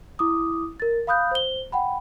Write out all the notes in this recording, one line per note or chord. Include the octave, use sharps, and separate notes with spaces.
E4 D6 D#6
A#4 A6
F5 B5 D#6 F#6 G6
C5 G7
F#5 G5 B5